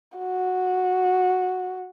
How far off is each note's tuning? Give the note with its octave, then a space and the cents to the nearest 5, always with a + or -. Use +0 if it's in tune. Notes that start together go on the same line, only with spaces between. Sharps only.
F#4 -10